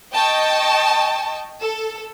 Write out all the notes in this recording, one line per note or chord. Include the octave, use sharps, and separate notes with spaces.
D#5 G5 A5 C#6
A4